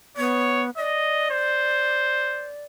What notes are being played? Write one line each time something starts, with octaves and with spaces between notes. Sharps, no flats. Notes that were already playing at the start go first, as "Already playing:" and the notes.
B3 C#5
D5 D#5
C5